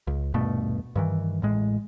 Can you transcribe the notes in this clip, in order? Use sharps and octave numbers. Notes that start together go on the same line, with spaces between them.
C#2
D#1 G2 B2 A3
G2 D#3 E3
A1 A2 G#3